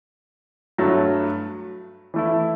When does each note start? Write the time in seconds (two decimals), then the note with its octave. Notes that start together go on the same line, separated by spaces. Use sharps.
0.78 G2 F#3 A3
2.14 E3 A3 E4